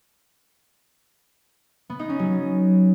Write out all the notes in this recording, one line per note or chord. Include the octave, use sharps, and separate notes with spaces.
B3
D#4
C#4
F#3